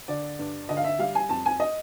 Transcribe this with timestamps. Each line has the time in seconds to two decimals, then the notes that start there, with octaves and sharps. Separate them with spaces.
0.08 D3 D5
0.39 G2
0.69 D3 D#5
0.77 F5
0.84 E5
0.99 G3 F5
1.15 G#5
1.29 F2 A5
1.46 G#5
1.60 D#5